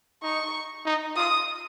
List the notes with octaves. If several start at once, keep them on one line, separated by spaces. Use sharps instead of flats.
D#4 C#6
D#4
F4 D#6